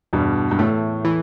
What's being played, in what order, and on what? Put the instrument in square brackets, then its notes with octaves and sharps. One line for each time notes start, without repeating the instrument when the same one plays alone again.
[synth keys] E2 [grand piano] G2 B2
[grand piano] G2
[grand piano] A2 [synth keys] A3
[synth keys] E3